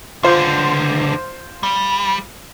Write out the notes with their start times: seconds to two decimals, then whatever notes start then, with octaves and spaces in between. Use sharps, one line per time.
0.23 C#2 D3 F4 C5
1.63 G3